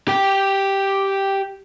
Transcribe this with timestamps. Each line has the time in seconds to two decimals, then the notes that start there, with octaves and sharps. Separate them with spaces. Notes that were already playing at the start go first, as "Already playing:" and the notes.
0.08 G4 G5